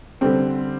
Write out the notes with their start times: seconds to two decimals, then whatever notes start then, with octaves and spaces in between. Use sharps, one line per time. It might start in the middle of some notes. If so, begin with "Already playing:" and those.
0.21 D3 G3 C4